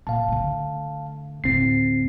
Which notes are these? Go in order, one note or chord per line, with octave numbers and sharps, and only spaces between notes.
A#2 F5 A5
D3 A3
D2 A2 C4 C7